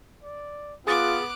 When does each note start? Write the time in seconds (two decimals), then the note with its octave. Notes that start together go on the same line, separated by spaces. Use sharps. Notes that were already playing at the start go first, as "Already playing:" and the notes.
0.23 D5
0.87 B3 F4 G#4 D6 D#6 F#6 A6